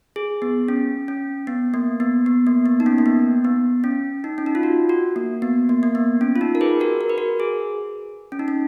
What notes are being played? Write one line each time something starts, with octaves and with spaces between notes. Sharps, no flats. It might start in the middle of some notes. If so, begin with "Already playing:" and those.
G#4
B3
C#4
C#4
B3
A#3
B3
B3
A#3
B3
D#4
C#4
A#3
B3
B3
C#4
D#4
C#4
D#4
F4
F#4
F#4
A#3
B3
A#3
A#3
B3
C#4
F4
D#4
A#4
G#4 B4
F#4 A#4
A#4
B4
F#4 A#4
G#4
C#4
D#4
C#4